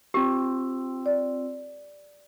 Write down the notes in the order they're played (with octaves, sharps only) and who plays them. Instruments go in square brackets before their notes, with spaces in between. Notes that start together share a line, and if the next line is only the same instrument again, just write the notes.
[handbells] C4 F4 E6 [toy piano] G4
[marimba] D5